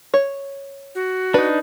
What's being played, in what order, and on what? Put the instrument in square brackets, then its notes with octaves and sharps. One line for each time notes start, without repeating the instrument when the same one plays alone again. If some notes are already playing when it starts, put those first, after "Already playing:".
[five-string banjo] C#5
[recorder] F#4
[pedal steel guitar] D4 D#4 [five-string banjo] B4